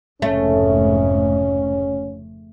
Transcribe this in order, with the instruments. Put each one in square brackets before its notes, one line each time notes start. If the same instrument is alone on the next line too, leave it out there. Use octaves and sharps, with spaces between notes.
[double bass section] F1 G#2 C#3 [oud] A3 [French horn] C#4